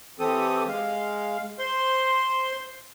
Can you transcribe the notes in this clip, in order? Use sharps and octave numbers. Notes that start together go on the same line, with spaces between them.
E3 C4 G4 A4 D#6
G#3 F5
C5 C6